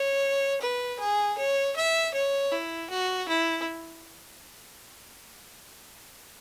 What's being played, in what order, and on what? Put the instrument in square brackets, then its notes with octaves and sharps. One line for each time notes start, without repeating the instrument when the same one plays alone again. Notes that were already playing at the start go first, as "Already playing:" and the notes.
Already playing: [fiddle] C#5
B4
G#4
C#5
E5
C#5
E4
F#4
E4